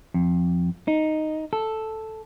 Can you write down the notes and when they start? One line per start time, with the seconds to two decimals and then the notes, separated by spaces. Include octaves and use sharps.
0.14 F2
0.88 D#4
1.53 A4